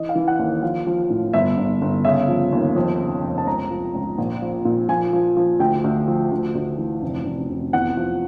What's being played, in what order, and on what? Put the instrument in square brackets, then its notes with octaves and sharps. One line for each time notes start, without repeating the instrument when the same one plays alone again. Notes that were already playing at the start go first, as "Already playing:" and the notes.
Already playing: [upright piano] E3 D#5
F5
E3
F#5
D#2
F3 F5
F3
A2
G1 E5
G1
G1
C#3 E5
F3
D#2
F2
C#3
F1
A5
C#2 A#5
F3
C#2
A#1
F3
A#2
F3 G#5
F3
F3
D2 G5
D2
F3
D2
D2
E3
F1
F1
F1
E2 F#5
F3